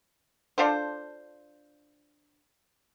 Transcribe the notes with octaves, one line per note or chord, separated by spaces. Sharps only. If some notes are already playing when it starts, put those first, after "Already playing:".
D4 F4 A4 C5